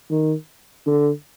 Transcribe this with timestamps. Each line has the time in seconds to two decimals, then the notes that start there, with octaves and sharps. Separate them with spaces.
0.11 D#3
0.87 D3